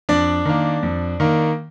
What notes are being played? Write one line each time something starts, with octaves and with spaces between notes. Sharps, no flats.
F2 D4 D5
D#3 A#3
F2
D#3 A#3